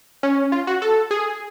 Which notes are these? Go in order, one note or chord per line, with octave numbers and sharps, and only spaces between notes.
C#4
F4
F#4
A4
G#4